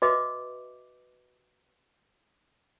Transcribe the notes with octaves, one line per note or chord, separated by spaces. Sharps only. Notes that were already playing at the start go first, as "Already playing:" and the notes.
F#4 B4 D#5 E5 D6